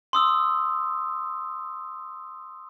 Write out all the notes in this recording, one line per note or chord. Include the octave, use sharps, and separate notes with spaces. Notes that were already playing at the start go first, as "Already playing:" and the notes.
C6 D#6 E6